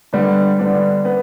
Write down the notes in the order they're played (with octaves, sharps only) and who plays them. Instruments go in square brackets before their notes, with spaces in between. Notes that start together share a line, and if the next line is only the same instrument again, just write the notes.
[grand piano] D3 G3 B3 D4
D3 G3 B3 D4
B3